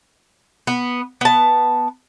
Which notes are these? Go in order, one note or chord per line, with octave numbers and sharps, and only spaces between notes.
B3
B3 A5